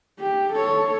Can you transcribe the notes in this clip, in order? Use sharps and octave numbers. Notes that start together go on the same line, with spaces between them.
G4
A4 C#5